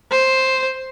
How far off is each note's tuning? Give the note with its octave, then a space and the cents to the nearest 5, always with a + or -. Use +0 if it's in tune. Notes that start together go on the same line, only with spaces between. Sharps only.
C5 +5